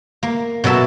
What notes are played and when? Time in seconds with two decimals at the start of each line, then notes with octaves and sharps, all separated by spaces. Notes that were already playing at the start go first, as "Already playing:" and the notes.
0.23 A#3
0.64 B2 F#3 A4 E5 A5